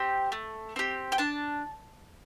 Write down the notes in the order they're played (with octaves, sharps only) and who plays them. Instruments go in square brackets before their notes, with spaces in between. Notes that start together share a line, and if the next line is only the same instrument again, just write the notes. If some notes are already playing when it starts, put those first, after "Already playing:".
Already playing: [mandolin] C4 G4
A3
C4 G4
G5
D4 A5